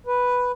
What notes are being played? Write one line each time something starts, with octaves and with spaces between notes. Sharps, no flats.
B4